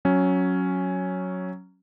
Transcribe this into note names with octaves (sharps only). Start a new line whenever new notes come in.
F#3 C#4